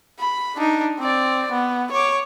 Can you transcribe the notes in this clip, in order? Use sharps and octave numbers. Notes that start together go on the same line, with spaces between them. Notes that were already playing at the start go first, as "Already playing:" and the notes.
B5
D4 D#4
C4 D5
B3
C#5 D6